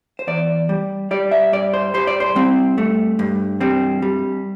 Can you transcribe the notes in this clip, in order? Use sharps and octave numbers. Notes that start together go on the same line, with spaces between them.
C5
E2 D5
G3
G3 D5
E5
G2 D5
C5
G3 C5
D5
C5
G3 C4
G2 A3
G2
G3 C4
G3